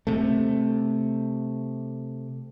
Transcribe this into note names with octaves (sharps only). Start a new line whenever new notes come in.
C3 A3